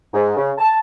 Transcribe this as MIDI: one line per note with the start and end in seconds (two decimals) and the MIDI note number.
0.14 0.34 44
0.36 0.51 49
0.58 0.77 81